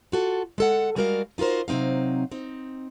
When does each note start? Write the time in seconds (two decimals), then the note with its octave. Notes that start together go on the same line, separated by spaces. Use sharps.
0.12 F4 F#4 A4
0.58 G#3 A4 F#5
0.96 G3 G#3 F#4 A#4 D5 F5
1.38 D#4 F4 F#4 A#4 C5
1.68 C3 F#3 C4 D#4 F5
2.31 C4 D#4